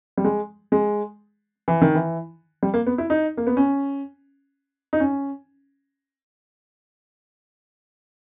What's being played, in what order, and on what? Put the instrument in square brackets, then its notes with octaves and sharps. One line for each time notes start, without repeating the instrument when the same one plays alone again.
[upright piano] G3
G#3
G#3
E3
D#3
E3
G3
A#3
B3
E4
D#4
A#3
B3
C#4
D#4
C#4